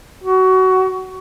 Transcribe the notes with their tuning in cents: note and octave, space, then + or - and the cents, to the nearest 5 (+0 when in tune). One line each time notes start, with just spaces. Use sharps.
F#4 +20